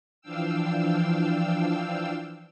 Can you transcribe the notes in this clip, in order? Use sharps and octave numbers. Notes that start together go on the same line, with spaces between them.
E3 F3 D4 F5 G5 E6